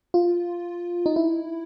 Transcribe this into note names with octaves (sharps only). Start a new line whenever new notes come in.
F4
D#4
E4